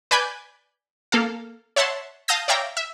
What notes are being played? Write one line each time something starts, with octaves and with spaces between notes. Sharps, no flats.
B4 D5 G#5 B5 G6
A#3 A4 F5
C#5 E5 F#5 A5 C6
F5 A5 D#6 G6 A#6
C#5 D5 E5 F5 G5 A#5
E5